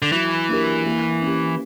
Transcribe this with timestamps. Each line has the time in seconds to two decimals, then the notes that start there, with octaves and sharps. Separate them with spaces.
0.02 D3
0.12 E3 F#3
0.48 A#3 D4 G4 A#4
0.85 A#3
1.22 C#4 G4